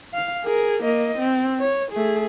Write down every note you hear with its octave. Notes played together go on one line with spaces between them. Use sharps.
F5
G#4 A#4
A#3 D#5
C4
C#5
A3 G#4